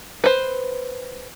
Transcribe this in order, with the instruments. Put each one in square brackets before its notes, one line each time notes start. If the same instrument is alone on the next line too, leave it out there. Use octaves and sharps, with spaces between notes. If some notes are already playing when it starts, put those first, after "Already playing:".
[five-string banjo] B4 C5